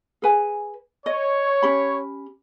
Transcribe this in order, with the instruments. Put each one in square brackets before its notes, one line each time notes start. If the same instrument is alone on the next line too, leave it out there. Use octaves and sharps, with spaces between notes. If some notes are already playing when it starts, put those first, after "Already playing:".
[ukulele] G#4 B4 G#5
[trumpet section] C#5 [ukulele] D#5
[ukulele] C#4 G4 B5